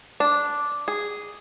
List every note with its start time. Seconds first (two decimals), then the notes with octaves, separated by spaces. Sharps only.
0.20 D4
0.88 G#4